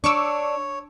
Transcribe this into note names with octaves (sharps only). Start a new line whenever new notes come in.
D4 C#5 C#6 D6 E6